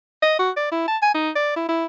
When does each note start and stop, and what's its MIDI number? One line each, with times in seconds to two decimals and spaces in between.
0.22 0.37 75
0.39 0.51 66
0.57 0.70 74
0.71 0.86 64
0.88 0.97 81
1.02 1.13 80
1.14 1.30 63
1.36 1.56 74
1.56 1.64 64
1.69 1.86 64